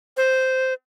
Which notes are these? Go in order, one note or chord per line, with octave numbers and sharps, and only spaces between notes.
C5